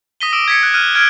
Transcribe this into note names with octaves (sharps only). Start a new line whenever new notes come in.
D#6 A#6 B6 D#7 G7
D6 E6 D7
G#6 B6 C#7
F#6
F6 F#6 D#7
F6 F#6 G#6 D7